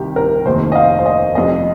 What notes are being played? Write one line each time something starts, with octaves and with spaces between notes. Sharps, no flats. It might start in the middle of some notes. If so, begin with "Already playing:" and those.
Already playing: C2 C3 D#3 G4
A#4
F1 D#2 D#3 C5
D#5
F5
C5
D#5
F1 F2 C3 D#5